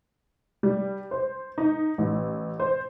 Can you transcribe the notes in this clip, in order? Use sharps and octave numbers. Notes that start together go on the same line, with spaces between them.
G3
C5
D#4
A1
C5